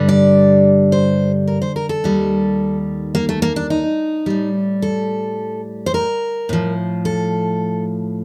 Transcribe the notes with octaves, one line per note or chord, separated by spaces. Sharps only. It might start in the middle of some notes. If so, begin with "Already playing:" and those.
Already playing: G2 D3 G3
D5
C5
A#4
C5
A#4
A4
D#2 D#3 G3
A#3
A3
A#3
D4
D#4
A2 G3
A4
C5
A#4
A2 F3
A4